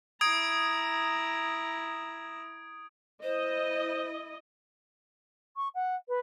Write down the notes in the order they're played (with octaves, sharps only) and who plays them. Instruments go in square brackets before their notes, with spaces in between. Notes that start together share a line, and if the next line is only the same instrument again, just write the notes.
[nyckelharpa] E4 A#5 [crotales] D#6 G#6 D7
[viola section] E4 D#5 [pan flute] C5
[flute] C#6
F#5
B4